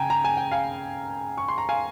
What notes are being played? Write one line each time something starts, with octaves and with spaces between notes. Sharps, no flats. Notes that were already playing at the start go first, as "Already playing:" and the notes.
Already playing: C#3 G5 G#5 A#5
A#5
G#5
G5
F5 G#5
C#6
C6
A#5
F5 G#5